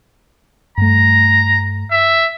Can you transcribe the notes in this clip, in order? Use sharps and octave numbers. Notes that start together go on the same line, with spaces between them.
G2 A3 A#5
E5